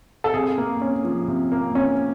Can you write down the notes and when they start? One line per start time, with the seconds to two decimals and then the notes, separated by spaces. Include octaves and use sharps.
0.24 A4
0.34 C3 G#4
0.58 A#3
0.81 C#4
1.04 F3
1.28 C3
1.52 A#3
1.75 C#4